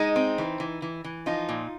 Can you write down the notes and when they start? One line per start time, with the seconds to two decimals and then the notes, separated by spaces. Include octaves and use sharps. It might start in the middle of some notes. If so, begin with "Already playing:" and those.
Already playing: G#3 D#4
0.16 C4
0.38 E3
0.60 E3
0.82 E3
1.04 E3
1.26 F3 D#4 F4
1.49 A#2